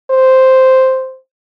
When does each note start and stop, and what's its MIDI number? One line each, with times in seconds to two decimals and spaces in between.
0.11 1.18 72